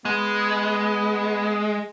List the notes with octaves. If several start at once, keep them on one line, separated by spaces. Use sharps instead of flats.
G#3 B3